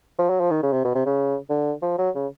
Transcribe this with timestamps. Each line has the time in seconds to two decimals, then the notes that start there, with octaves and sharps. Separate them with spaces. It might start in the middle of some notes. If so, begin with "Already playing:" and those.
0.19 F3
0.30 F#3
0.40 F3
0.51 D#3
0.63 C#3
0.72 C3
0.84 B2
0.95 C3
1.06 C#3
1.49 D3
1.82 F3
1.98 F#3
2.15 C#3